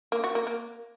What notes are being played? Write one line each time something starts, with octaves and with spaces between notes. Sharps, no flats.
A#3
F#4
A#3
A#3